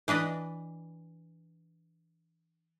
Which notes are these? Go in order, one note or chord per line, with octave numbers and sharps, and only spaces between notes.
E3 D4 B4 D#5